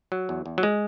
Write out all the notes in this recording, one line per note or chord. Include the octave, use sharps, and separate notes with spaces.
F#3
E2
E2
F#3
G#3